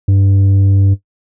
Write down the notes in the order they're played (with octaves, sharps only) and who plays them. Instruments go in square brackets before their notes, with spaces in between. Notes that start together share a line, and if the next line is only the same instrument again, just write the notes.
[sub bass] G2